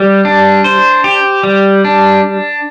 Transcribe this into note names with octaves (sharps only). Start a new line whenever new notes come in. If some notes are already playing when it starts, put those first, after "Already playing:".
Already playing: G3 G4
D4
C5
G4
G3
D4